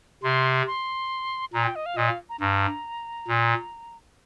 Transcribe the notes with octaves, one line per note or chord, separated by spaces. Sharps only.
C3 C6
C6
A#2 A#5
G5
D#5
F5
A#2 D#5
F5
A#5
G2 A#5
A#2